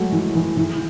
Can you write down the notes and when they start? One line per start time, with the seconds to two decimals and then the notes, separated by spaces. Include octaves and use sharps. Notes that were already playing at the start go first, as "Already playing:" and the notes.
Already playing: F#3 G#3 A3
0.12 E3
0.35 E3
0.57 E3